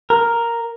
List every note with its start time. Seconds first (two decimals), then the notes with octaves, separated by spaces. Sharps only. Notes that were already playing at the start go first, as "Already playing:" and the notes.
0.10 A#4